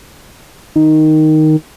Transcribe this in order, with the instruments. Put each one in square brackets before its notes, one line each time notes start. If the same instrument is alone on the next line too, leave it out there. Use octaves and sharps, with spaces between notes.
[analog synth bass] D#3